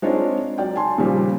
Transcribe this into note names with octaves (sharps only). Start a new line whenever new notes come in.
G#3 C4 D4 D#4 F4 C#5
F#3 D5 G5
G#5 A5 C6
D#2 A#2 C#3 F3 G3